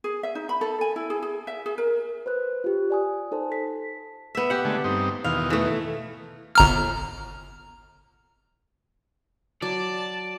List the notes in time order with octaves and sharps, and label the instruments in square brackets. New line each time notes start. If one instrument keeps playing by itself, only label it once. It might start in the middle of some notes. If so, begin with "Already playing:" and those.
[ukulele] G#4
E5
D#4
B5
A4
G#5
E4
G#4
G#4
E5
G#4
A#4
[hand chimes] B4 C5 F#6
F4 G4
D5 G#5 D#6
D#4 A4 C5 A5
B6
[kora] B3 E5
G4 F#5
[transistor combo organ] D3 G#3 A3
G2 C4 D#4
[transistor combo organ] E2 B2 D#3 [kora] F5
[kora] E3 A3
[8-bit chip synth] G1 A#5 F6
[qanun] F#3 [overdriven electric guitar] D5 [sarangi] A5